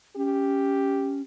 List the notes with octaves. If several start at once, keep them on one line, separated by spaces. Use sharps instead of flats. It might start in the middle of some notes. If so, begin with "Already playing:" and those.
C#4 G4